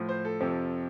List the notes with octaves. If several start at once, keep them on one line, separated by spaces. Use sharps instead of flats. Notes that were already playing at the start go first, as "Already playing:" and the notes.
Already playing: A2 F3
C5
A4
F2 C3 F3